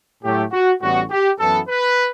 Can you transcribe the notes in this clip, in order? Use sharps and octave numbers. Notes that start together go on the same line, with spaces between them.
A2 F#3 A3 G4
F#4
A1 A2 G3 B3 F#4
G4
F#2 E3 B3 A4
B4